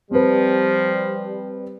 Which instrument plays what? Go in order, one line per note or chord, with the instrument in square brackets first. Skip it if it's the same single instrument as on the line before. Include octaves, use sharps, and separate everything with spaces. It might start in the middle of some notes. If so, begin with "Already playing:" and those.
[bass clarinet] F3 [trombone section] G3 [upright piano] C4 B4